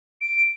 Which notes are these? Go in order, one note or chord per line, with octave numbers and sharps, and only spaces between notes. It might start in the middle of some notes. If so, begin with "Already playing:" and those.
D7